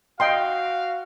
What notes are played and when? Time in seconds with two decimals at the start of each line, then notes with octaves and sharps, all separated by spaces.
0.20 F#4 D#5 F5 G5 C6